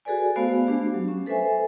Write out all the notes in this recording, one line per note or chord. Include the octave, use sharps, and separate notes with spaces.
F#4 G#4 A4 B4 D5 G#5
A3 B3 F#4 C5 F5
A3 D4 G4
F#3
C#4
A4 B4 C5 E5 G#5